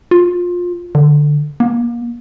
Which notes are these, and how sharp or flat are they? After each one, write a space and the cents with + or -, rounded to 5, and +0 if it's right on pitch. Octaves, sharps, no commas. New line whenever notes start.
F4 +20
D3 +10
A#3 +30